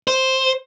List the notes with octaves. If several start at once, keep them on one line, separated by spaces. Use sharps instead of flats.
C5